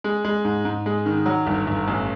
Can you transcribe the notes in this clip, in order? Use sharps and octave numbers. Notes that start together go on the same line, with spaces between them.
G#3
G#3
G#2
G#2
G#3
D#3
F#3
G1
G1
A1